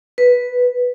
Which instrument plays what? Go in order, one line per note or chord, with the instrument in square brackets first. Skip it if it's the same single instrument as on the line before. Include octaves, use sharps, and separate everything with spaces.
[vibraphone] B4